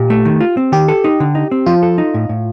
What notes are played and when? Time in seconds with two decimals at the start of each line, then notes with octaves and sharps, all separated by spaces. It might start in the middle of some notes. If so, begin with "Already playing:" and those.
Already playing: A#2 G4
0.10 A3
0.25 D#3
0.41 F4
0.57 C4
0.72 D#3 G4
0.88 A4
1.04 D#4
1.20 D3
1.35 D#4
1.51 C4
1.66 F3 F4
1.83 A4
1.98 D#4
2.14 A2
2.29 A2